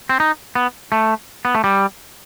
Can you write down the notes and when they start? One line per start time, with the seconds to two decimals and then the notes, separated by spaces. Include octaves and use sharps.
0.09 C4
0.20 D#4
0.55 B3
0.92 A3
1.45 B3
1.55 A3
1.64 G3